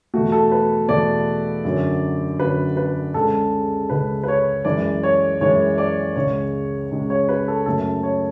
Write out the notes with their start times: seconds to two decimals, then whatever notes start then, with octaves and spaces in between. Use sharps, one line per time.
0.14 E2 B2 A3 F#4
0.32 A4
0.52 B4
0.89 E2 B2 A3 D5
1.64 F#2 D3 F#3
2.39 F#2 D3 F#3 B4
2.77 B4
3.14 C#2 C#3 G#3 A4
3.90 C#2 C#3 G#3 B4
4.23 B4
4.28 C#5
4.65 F#2 E3 G#3 D5
5.03 C#5
5.40 F#2 E3 G#3 C#5
5.78 D5
6.16 C#2 C#3 G#3 C#5
6.91 C#2 C#3 G#3
7.10 C#5
7.29 B4
7.48 A4
7.66 F#2 C#3 F#3 A3 A4
8.03 C#5